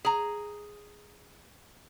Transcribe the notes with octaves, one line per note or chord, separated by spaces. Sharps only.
G#4 A#5